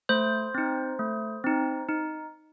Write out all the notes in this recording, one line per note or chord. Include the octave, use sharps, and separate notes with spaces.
A3 C5
C4 D#4
A3
C4 D#4
D#4